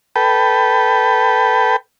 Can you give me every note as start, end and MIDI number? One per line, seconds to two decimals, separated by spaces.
0.16 1.76 69
0.16 1.76 71
0.16 1.76 79